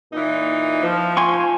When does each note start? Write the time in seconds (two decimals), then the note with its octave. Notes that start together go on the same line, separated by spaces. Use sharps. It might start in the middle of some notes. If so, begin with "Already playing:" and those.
0.13 A#2 E3 D#4
0.83 F3
1.17 G#5 C6 C#6